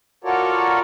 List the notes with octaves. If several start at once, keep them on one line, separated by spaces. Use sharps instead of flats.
F4 F#4 A4 A#4 C#5 D5